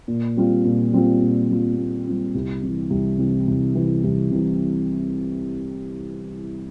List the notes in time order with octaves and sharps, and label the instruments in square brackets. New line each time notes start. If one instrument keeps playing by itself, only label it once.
[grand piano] A#2
G3 C4 F4
A#2
G3 C4 F4
A#2
G3 C4 F4
A#2
G3 C4 F4
C2
C3 E3
C2
C3 E3
C2
C3 E3
C2
C3 E3